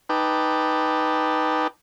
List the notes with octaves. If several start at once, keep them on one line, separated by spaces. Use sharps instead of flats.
D#4 B4 G5 A5 D6